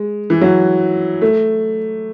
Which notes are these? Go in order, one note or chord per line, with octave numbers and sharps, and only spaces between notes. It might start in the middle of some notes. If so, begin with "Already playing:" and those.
Already playing: G#3
E3
F#3
A3